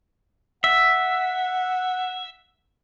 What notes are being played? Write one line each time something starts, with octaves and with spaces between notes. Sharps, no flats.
E5 F#5